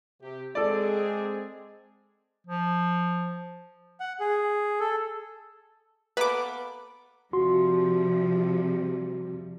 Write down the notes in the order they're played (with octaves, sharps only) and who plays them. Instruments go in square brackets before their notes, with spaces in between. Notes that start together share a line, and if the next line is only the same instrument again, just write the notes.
[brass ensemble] C3 G4
[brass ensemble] G#3 C4 G#4 [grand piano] A4 D5
[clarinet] F3
[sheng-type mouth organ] F#5
G#4
A4
[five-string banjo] A#3 B3 A4 [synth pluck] B4 D6
[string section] C3 F3 G3 [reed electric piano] F#4 C6